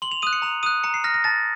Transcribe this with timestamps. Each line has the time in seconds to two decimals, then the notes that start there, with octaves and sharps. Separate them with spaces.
0.02 C6 F#7
0.11 F7
0.22 D#6 F#6 D#7
0.33 C#7
0.42 A#5 F7
0.63 D#6 F#6 D#7
0.84 A#5 C#7
0.94 C7
1.04 F6 A#6
1.14 A#6
1.24 A5 A6